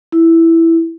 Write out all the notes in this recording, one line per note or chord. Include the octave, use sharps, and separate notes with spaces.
E4